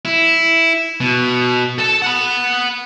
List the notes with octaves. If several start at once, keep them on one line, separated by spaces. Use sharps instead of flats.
E4
B2
A4 A5
F#5 B5